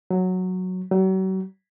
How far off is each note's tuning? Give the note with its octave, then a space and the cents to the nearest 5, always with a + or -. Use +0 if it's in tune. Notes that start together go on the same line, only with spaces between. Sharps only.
F#3 -5
F#3 +40